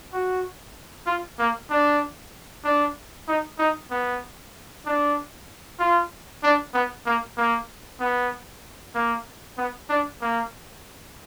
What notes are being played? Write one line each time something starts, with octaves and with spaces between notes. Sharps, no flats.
F#4
F4
A#3
D4
D4
D#4
D#4
B3
D4
F4
D4
B3
A#3
A#3
B3
A#3
B3
D4
A#3